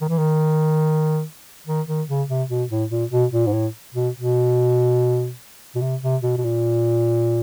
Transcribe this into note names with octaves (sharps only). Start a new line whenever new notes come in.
D#3
E3
D#3
D#3
D#3
C#3
C3
B2
A2
A#2
B2
A#2
G#2
A2
B2
B2
B2
C3
C3
B2
B2
A#2